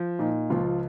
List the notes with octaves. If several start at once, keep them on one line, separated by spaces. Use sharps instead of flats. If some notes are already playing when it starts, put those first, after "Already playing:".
Already playing: F3
A#2 D#4
C#2 F3 F4